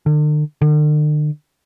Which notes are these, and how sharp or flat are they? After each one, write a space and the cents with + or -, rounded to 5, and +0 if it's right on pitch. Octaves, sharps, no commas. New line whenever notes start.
D3 +45
D3 +45